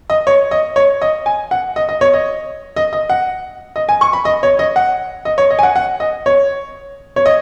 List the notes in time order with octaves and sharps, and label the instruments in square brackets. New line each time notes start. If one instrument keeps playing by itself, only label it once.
[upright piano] D#5
C#5
D#5
C#5
D#5
G#5
F#5
D#5
D#5
C#5
D#5
D#5
D#5
F#5
D#5
G#5
C#6
B5
D#5
C#5
D#5
F#5
D#5
C#5
D#5
G#5
F#5
F#5
D#5
C#5
C#5
D#5